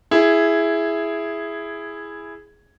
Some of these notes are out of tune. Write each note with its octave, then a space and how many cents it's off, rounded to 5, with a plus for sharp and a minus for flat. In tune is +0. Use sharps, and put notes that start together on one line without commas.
E4 +5 G#4 +0